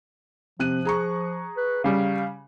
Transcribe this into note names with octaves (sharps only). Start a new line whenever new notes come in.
C3 F3 F#6 D#7
G#4 A#5 C#6
B4
C#3 G3 F5